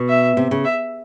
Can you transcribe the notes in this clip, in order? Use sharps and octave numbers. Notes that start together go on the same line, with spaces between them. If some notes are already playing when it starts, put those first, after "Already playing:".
Already playing: B2
E5
C3
C#3
E5